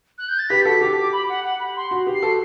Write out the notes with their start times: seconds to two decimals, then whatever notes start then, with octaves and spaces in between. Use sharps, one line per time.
0.18 F#6
0.29 G6
0.39 A6
0.50 G4 B4 B6
0.65 F#4 A4 B6
0.81 G4 D6
0.97 D6
1.12 B5
1.29 F#5
1.44 F#5
1.59 B5
1.76 C6
1.91 F#4
2.07 G4
2.14 C7
2.22 F#4 A4